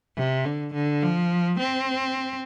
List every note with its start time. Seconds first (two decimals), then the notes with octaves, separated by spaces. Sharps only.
0.17 C3
0.45 D3
0.74 D3
1.02 F3
1.59 C4